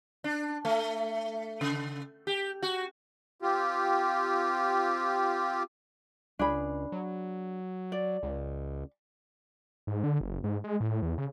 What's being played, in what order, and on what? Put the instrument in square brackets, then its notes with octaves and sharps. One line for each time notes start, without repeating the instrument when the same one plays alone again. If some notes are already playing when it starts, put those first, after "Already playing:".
[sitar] D4
A3
C#3
G4
F#4
[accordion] C4 F4 G4
[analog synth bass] C#2 [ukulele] D4 G#4 B5
[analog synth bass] F#3
[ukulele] D5
[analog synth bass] C#2
[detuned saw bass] G#2
D3
F#1
G#2
G#3
A2
E2
C#3